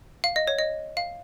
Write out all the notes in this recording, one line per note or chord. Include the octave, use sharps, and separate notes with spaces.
F5
D#5
C#5
D#5
F5